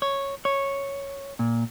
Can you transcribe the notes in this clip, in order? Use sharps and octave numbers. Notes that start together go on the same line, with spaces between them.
C#5
C#5
A#2